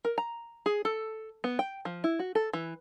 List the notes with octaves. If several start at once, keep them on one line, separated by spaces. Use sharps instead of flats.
A#4
A#5
G#4
A4
B3
G5
F3
E4
F#4
A4
E3